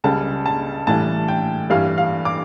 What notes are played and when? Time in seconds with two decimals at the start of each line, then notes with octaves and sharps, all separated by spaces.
0.04 C#2 C#3 G3 A5
0.46 A5
0.87 A2 E3 G3 A5
1.28 G5
1.70 G2 E3 G3 F5
1.98 F5
2.25 D6